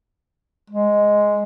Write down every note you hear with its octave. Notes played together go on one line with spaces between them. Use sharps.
G#3